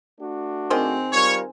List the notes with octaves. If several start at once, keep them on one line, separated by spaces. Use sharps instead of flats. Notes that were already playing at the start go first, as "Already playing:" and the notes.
A3 D4 F#4
D#3 C4 G#4 C5
G3 F4 A#4 C#5